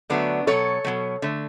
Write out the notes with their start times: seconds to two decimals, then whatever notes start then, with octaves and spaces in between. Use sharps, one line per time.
0.10 D3 F#3 A3 B3 D4
0.47 B2 F#3 A3 A4 C#5
0.85 B2 F#3 A3
1.22 D3 A3